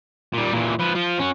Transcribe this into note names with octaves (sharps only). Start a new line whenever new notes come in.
A#2 G3
A#2 E3
F3 B4
F3 F4
C#4 F#4